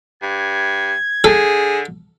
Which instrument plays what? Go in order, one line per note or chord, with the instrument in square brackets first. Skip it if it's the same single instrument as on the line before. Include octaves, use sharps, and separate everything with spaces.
[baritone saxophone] G2 [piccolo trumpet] G#6
[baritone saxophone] D3 [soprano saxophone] G#4 [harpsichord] A4